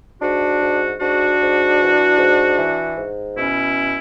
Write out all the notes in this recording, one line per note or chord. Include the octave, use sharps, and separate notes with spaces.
G#2 D4 F#4
G#2
G#2 D4 F#4
G#2
E3
G#2
E3
G#2
B2 C#4 E4